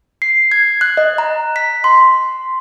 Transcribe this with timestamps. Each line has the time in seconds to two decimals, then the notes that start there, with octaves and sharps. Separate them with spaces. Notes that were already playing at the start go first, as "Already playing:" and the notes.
0.22 C7
0.52 G#6
0.81 F#6
0.97 D#5
1.18 A#5
1.56 B6
1.84 C6